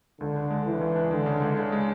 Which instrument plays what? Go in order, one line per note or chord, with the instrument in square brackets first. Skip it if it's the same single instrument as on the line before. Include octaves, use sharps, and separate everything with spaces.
[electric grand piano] C#2 [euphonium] D3
[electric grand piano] D4
G#3
[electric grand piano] C#3 [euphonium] E3
[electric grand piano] C#2
D4
[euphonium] D3 [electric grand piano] G#3
[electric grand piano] C#3
C#2
[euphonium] C#3 [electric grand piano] D4
[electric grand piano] G#3